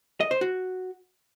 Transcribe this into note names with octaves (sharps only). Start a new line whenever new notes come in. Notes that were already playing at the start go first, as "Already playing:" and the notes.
D#5
C5
F#4